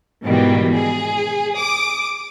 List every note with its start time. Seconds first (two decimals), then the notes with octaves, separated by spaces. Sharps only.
0.24 G#2 B2 D#3 E3 G3
0.73 G#4
1.55 D6 D#6